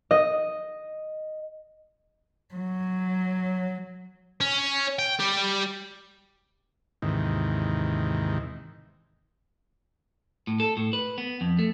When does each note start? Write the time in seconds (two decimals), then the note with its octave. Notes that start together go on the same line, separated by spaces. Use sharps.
0.11 D#5
2.54 F#3
4.41 C#4
4.99 G5
5.19 G3 G4
7.02 D#2 G#2 C3 D#3 E3
10.47 A2
10.60 A4
10.77 A2
10.93 B4
11.18 B3
11.41 F2
11.59 A3